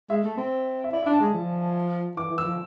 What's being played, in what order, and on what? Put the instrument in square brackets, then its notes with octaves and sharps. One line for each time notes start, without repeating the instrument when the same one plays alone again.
[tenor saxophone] G#3 [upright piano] E5
[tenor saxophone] A3
C4
[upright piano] E5
[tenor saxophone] E4 [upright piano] D5
[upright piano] E5
[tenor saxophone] D4
[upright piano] A5
[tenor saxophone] G#3 [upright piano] G#5
[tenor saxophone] F3
[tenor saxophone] E3 [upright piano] D6
[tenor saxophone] E3
[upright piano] E6
[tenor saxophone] F3